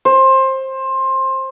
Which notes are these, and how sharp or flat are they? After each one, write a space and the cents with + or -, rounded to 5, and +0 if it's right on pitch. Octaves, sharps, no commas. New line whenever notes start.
C5 +20